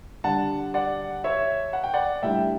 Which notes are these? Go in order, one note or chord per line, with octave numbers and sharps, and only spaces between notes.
D3 G3 D4 F#5 A5
D5 F#5
C#5 E5
F#5
G5
D5 F#5
A2 G3 D4 E5 G5